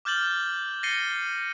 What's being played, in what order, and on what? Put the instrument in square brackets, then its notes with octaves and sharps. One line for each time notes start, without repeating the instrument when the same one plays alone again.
[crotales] D6 F6 G6 A6 F#7 G7
A6 A#6 C7 C#7 D#7 G7